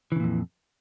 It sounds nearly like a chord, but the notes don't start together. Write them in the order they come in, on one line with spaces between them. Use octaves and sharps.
E3 C#3 A#2 F2